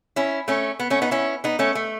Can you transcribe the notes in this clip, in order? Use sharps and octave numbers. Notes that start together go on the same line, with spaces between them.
C#4 E4
A3 C#4
B3
A3 C#4
B3 D#4
C#4 E4
B3 D#4
A3 C#4
A3